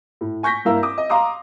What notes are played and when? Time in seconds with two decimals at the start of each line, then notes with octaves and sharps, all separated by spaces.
0.21 A2
0.43 G#5 C#6 G6 A#6 B6
0.65 G2 A#3 E4 A#4 F5 E6
0.83 D6 D#6
0.98 D#5
1.10 F5 A#5 C6 D6 D#6